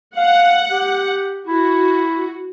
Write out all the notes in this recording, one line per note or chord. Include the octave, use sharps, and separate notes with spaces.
F5 F#5
G4
E4 F#4